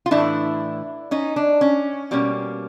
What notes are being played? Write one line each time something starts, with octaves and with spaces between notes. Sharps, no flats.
F4
A2 E3 A3 D4 E4
C#4 D#4
D4
C#4
B2 G3 A#3 C#4